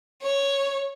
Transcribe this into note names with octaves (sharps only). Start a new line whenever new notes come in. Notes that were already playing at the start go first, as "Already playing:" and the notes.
C#5